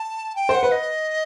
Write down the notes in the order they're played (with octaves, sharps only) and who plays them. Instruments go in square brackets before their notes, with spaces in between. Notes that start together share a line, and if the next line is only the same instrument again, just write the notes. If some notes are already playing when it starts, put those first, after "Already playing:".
Already playing: [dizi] A5
G5
[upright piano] C5
[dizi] F#5
[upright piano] B4
[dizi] D#5